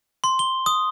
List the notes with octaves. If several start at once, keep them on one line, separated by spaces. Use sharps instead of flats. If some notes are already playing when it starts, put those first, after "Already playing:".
C6
G7
D#6